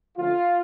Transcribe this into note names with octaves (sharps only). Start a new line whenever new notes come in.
D3 F3 A3 C#4 F4